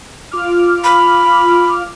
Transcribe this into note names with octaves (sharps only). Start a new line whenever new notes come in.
F4 D6 F6
B5